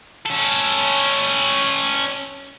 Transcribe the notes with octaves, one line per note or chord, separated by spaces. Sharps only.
C#4 A4